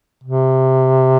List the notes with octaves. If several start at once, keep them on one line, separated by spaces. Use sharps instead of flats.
C3